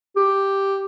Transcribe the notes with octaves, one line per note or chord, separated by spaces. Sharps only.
G4